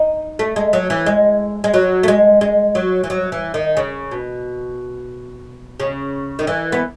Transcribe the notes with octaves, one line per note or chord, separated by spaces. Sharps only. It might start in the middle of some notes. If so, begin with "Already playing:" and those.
Already playing: D#4
A3
G#3
F#3
E3
G#3
G#3
F#3
A3
G#3
G#3
F#3
E3
F#3
E3
D#3
C#3
B2
C#3
D#3
E3
B3